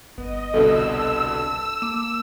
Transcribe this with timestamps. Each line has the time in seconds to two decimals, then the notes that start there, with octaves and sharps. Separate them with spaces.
0.18 G1 B3 D#5
0.54 C2 B2 D3 A4 E6
0.92 A5
1.82 A#3 D6 E7